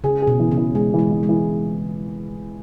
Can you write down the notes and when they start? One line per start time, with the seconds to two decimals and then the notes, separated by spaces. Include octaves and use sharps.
0.04 C#3 G#4
0.22 G#4
0.27 B2
0.39 E3
0.51 C#3
0.57 E3
0.75 G#3 G#4
0.94 E3
0.99 G#3
1.11 E3
1.23 G#3
1.29 E3